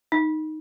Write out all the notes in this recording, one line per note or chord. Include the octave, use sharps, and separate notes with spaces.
D#4